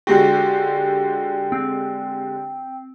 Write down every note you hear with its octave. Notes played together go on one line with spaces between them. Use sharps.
D3 G#3 F#4 G4 G5
C4